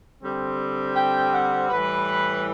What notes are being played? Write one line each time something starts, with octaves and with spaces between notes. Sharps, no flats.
D3 G3 C4
G5
F#5
A2 E3 G3 B4